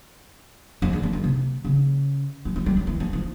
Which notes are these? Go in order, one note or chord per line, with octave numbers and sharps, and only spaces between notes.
F2
E2
F2
F#2
C3
C#3
F3
F3
G3
F#3
E3
F3
F3